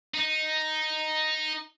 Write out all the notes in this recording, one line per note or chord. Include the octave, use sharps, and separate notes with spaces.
D#4